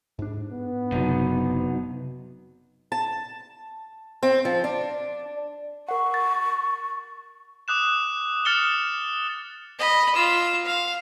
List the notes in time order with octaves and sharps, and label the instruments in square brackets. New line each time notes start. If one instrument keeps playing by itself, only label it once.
[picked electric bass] G#2 D4
[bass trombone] B3
[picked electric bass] F#1 [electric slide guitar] C3 F#3 D#4
[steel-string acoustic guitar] A5
C4
F3
D4
[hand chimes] A#4 F#5 [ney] C#6
[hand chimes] A6
[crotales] D6 D#6 F#6 E7
D#6 F6 A6 C#7 E7 G7
[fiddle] D#5 B5
F4 E6
F5